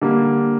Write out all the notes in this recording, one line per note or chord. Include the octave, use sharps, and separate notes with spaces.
D3 G3 A#3